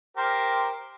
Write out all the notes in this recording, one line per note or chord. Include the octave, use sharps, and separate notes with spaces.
G4 A#4 C5